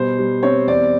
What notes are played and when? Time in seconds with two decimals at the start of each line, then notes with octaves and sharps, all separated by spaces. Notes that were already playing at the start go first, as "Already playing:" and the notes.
Already playing: B2 G3 C5
0.19 G3
0.43 C4 C#5
0.67 E2 D5